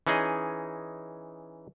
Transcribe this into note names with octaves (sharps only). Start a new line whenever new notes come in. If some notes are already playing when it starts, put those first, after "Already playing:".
E3 C#4 D#4 G#4 D#5